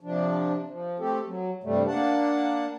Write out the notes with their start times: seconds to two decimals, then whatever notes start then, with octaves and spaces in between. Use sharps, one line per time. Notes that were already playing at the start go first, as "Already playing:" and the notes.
0.01 C3 F3 D4
0.69 F3
0.99 A3 C4 G4 A4
1.27 F#3
1.64 G2 C3 G3 A3
1.88 A#3 D4 F#5 A5